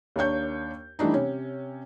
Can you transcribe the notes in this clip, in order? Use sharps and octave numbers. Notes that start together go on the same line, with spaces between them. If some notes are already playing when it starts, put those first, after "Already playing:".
D#2 A#3 D4 C#5 G6
E3 G3 A3 D4 D#4
C3 C#4